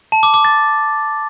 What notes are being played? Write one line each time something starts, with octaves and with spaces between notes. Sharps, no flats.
A5
D6
D6
A6